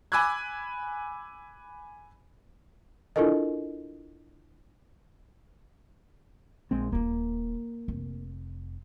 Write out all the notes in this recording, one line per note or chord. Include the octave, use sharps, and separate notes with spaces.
G#5 B5 D6 E6 F#6 G#6
D4 E4 F4 A4 A#4 D#5
A#1 G#3 C4
D#1 A#3 F4
F1